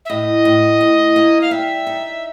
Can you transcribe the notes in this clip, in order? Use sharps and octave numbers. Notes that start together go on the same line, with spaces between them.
E5
A2 D#5
A2
A2
A#3
F5
G3 E5
D#4